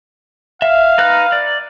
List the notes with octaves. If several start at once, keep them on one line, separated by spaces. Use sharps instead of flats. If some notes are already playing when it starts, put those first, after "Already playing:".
E5 F5
D#4 B4 F#6
D5